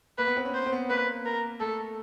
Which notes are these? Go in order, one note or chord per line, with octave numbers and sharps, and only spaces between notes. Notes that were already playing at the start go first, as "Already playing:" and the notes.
A#3 B4
B3
C4
C#4
C5
C4
B3
A#3 B4
A#4
A3 A4